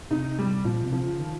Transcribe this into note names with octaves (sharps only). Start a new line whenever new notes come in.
C3 D#4
G3
A#2 F3
C3
F3
C#3
D#3